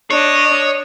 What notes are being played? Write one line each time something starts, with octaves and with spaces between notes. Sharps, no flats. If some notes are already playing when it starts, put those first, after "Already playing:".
D4 C#5 D#5